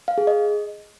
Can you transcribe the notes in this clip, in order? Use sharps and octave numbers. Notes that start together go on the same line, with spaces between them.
F5
G#4
D#5